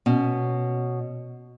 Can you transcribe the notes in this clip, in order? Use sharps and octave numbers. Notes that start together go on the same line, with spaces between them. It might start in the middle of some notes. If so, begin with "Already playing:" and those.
B2 C#4